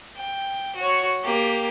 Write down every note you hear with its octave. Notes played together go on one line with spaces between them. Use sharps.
G5
F#4 C#5
A#3 G4